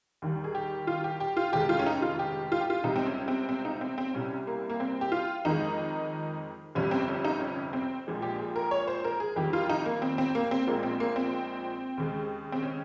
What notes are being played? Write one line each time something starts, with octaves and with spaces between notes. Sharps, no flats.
D#2 D#3 G3
G#4
G4
F4
G4
G4
F4
F1 D#2 C#3 G#3 G4
F4
C#4
D#4
F4
G4
F4
G4
F4
C#2 C3 G3 D#4
C4
C#4
C4
C4
D#4
C4
C4
C2 C3 G3 C#4
A#3
A#3
C4
G4
F4
F2 D#3 G#3 D#4
G1 F2 C3 G3 C#4
C4
C#4
D#4
C#4
C4
A#1 A#2 F3 G#3
G4
G#4
A#4
C#5
C5
A#4
G#4
F2 D#3 G3 G4
F4
D#4
A#3
C4
C4
A#3
C4
A#1 A#2 G#3 A#3
C4
A#3
C4
D#2 C#3 G#3
C4
C#4